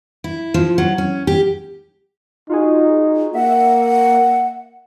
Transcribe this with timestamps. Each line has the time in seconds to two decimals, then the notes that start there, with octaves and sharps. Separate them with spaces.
0.24 E4
0.54 F3
0.78 F#3
0.98 C#4
1.27 G4
2.50 D#4 F4 F#4 G#4
3.34 A#3 E5 F#5